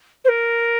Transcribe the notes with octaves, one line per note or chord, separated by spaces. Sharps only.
C5
A#4